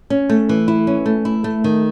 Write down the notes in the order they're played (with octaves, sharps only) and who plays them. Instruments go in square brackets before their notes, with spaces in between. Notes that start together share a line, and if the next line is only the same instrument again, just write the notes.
[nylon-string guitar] C#4
A3
E3
E4
C#4
A3
E4
A3
D#3